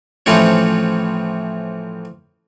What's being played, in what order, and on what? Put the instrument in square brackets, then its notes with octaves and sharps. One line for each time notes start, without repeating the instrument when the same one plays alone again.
[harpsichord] A2 E3 F3 C4 C#4